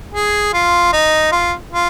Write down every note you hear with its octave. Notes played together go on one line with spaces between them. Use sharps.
G#4
F4
D#4
F4
F4